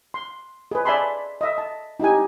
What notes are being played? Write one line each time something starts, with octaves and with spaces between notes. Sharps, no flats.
C6
G#4 B4
D5 E5 G#5 A5 B5 C6
D#5 E5
A5
D#4 E4 G4 G#5